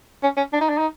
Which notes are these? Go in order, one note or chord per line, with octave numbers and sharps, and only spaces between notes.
C#4
C#4
D4
D#4
D4
D#4